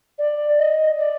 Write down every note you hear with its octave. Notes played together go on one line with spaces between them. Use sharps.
D5
D#5
D5